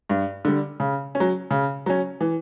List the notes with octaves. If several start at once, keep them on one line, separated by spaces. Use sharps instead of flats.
G2
D3 G3
C#3
C#4
F#3
C#3
F#3 C#4
E3